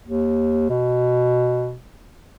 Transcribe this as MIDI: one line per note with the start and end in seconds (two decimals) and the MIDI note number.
0.05 0.68 39
0.70 1.76 47